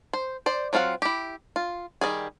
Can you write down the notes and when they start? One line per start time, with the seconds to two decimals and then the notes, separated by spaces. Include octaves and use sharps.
0.13 C5
0.46 C5 D5
0.73 F#3 C4 F4 F5 F#5
1.02 E4 G4
1.56 F4
2.01 D#3 F#3 G3 G#4